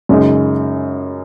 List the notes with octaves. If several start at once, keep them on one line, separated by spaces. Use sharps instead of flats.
F#2 C#3 G#3 D#4